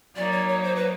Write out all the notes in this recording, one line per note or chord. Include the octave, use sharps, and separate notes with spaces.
F#3 A#3 D#4 D5
C#5
C#5
C5
B4